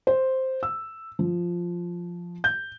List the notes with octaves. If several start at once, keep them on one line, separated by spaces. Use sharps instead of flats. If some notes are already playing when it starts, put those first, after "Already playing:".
C5
E6
F3
G6